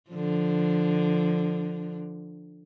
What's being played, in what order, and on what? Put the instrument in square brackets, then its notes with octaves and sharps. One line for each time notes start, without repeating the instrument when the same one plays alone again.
[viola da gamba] D3 F3